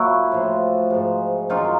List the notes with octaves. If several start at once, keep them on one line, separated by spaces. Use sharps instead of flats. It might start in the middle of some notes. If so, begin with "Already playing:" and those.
Already playing: A#2 F#3 E4 F#4
A2 F3
G#2 F3
F#2 D#3 F#3 D#4 F4